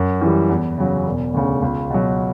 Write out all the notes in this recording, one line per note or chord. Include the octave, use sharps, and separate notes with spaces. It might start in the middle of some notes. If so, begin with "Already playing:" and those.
Already playing: F#2
E3 G3
E2
C#3 F#3
E1
D2 C#3
C#2
B2 F#3